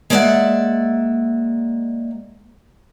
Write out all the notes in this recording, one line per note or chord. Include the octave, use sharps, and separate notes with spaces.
G#3 A#3 B3 D5 E5 F#5